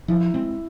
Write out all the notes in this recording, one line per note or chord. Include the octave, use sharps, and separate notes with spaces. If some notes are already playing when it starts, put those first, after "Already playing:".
F3 E4
G#3 C4